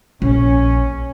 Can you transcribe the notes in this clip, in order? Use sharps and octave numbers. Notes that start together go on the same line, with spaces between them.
A#1 C#4